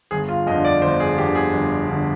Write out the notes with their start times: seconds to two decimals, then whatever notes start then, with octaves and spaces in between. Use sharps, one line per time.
0.11 G1 G#4
0.29 F4
0.47 F2 D#5
0.51 D3
0.64 D5
0.82 G1 C5
1.00 G#4
1.18 F2 D3 G4
1.35 G#4
1.53 G1
1.89 D3